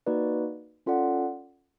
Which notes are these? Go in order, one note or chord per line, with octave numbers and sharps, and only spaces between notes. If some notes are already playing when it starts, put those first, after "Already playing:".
A#3 D#4 F#4 B4 D5
C#4 F4 A4 D5 F#5